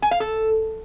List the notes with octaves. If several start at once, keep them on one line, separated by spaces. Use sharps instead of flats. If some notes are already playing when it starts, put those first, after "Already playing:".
G#5
F5
A4